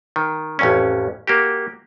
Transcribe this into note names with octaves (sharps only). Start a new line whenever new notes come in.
D#3
A1 F2 C#4
A#3 F#4 G4